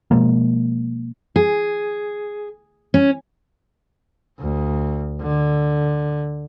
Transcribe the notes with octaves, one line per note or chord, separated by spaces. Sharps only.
B2 F3 G#3 A#3
G#4
C#4
D2
D3